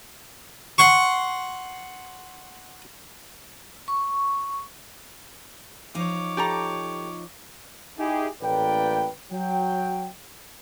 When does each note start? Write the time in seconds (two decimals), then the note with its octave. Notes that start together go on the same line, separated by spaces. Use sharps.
0.78 F#5 C6 C#6
3.88 C#6
5.95 F3 D#4 C#5 D6
6.37 G4 A4 A#5
7.99 D#4 E4 G4 G#4
8.42 A1 A2 A#3 B4 D5 G5
9.32 F#3 G5